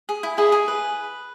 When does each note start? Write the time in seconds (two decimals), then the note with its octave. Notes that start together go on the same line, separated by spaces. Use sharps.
0.09 G#4
0.23 E4
0.38 E4 G#4
0.52 G#4
0.68 B4